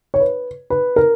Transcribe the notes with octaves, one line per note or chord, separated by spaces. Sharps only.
C#5
B4
B4
A#4